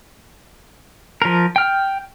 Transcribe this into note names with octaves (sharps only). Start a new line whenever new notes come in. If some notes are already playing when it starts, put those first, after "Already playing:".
F3 A#4
G5 F6